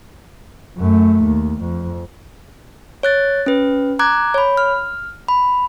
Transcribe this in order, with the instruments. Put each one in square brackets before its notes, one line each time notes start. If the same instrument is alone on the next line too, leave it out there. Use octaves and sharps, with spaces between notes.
[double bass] F#2 A3
D#2
F2
[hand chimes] C#5 F#6 A6
C#4 B4
A#5 D6 F#6 G#6
C#5 B5
F6
B5